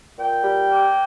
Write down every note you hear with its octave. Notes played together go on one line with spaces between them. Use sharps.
A#2 G5
G3
A#3